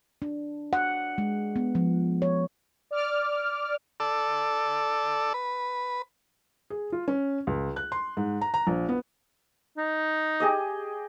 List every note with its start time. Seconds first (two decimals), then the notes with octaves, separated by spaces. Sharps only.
0.22 D4
0.73 F#5
1.18 G#3
1.56 B3
1.75 F3
2.22 C#5
2.91 D5 D6 F6
4.00 A4 D5 E6
5.34 B4
6.70 G#4
6.92 F4
7.08 C#4
7.47 C#2
7.76 F#6
7.92 C6
8.17 G#2
8.41 A#5
8.54 A#5
8.67 A#1
8.89 B3
9.78 D#4
10.40 G4 G#4 D#5